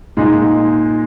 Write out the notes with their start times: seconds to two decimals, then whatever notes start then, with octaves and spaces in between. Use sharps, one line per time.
0.17 A#2 G#3 D#4